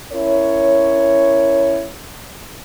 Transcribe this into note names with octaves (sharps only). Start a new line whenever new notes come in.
C#4 E4 A#4 C#5